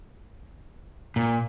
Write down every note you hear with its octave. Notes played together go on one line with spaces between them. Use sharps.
A#2